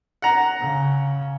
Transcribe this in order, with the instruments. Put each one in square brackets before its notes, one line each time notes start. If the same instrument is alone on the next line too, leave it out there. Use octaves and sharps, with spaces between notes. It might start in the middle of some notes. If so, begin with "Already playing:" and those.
[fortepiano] F#5 A#5
[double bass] C#3